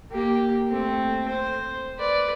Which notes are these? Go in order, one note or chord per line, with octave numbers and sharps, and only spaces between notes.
A#3 G4
A3 C4
C5
B4 D5